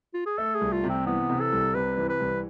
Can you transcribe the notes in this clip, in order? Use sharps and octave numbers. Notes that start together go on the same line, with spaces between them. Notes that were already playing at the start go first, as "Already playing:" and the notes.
F4
G#4
A3 A4
G#4
C2
F4
C3
C4
E3 B3
C3
A4
C2
C3 B4
E3
B4
C2